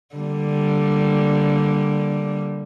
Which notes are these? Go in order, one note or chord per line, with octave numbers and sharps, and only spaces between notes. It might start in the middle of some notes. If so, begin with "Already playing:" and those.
D3 G3 A#3